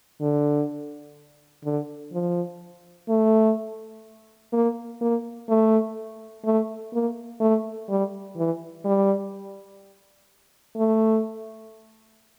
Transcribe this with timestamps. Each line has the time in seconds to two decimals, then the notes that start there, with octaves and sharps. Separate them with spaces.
0.21 D3
1.64 D3
2.12 F3
3.09 A3
4.53 A#3
5.01 A#3
5.49 A3
6.45 A3
6.93 A#3
7.40 A3
7.89 G3
8.37 E3
8.85 G3
10.76 A3